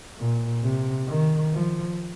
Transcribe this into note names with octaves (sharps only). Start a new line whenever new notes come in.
A#2
C3
D#3
F3